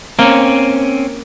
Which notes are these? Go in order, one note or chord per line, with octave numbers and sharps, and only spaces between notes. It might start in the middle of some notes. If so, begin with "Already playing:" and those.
A#3 C4 C#4